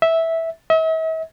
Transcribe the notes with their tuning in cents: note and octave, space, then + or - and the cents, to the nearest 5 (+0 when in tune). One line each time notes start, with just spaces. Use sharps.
E5 -10
E5 -45